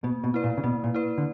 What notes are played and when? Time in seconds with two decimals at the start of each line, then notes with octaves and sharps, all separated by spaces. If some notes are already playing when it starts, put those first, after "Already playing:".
0.04 B2 A#3
0.24 B2
0.34 E4 B4 D5
0.44 A#2
0.58 C#3
0.64 B2 A#3
0.84 A#2
0.94 E4 B4 D5
1.18 D3